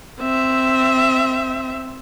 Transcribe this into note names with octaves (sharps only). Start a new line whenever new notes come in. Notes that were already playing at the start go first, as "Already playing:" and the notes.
C4 E5